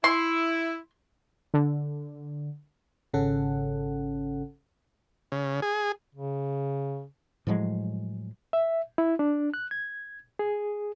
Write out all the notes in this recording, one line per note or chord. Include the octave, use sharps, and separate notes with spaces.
E4 C6
D3
G#1 C#3 C#4 A4 F#5
C#3
G#4
C#3
A2 F3 F#3 G#3
E5
E4
D4
F#6
G#6
G#4